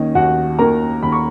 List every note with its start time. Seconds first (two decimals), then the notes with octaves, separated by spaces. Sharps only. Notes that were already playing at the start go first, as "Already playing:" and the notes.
Already playing: D#2 D#3 A#3 C#4 D#4
0.15 D#2 F#4 F#5
0.59 D#3 A#3 A#4 A#5
1.03 D#2 B5
1.12 C#6